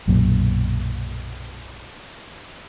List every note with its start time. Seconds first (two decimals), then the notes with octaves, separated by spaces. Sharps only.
0.08 B1 F#2 A#2